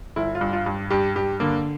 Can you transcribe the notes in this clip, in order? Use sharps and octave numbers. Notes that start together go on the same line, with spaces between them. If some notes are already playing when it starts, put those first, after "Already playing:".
G1 E4
F4
G2
F4
G2
G2 G4
G2 G4
D3 A#3